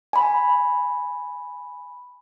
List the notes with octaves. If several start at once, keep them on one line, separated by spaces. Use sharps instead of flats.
G#5 B5